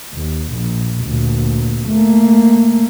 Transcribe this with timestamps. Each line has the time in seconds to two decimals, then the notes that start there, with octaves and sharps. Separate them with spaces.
0.13 D#2
0.52 A#1 A#2
1.05 D2 A#2
1.88 A3 A#3